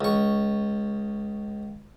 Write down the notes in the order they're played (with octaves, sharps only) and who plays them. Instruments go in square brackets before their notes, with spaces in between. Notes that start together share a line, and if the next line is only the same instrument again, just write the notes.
[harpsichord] C#2 C#6